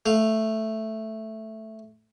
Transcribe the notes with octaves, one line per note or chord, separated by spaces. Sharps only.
A3 F5